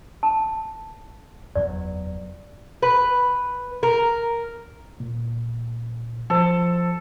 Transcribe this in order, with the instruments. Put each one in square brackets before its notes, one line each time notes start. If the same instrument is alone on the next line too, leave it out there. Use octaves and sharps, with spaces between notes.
[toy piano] A5
[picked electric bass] F#1 E2 F#3 [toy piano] D5
[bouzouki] B4
A#4
[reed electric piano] A#2
[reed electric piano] F3 C5 [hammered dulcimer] A4